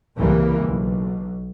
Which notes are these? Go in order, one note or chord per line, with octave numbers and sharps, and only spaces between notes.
C2 C#3 E3 G3 A#3
B1